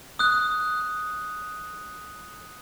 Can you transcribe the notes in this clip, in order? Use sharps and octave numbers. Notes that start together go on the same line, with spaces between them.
D#6 F#6